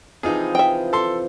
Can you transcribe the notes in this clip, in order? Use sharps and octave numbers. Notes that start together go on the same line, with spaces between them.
C3 E3 F3 D#4 F4 G#4
E5 G5
A4 C6